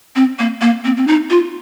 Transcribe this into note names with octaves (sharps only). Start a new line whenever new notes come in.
C4
A#3
A#3
C4
C4
D#4
F4